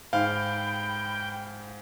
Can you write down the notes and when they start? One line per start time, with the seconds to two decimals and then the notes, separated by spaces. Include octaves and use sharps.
0.13 G#2 F5 G5 B5